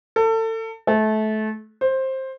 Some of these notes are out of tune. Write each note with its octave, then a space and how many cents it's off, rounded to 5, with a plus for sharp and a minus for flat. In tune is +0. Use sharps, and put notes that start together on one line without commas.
A4 +30
A3 -25
C5 +15